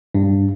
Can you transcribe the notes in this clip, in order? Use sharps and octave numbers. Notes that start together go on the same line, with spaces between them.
G2